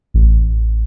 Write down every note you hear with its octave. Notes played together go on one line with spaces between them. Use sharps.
A1